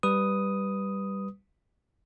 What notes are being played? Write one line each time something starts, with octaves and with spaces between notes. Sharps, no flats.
G3 B4 D#6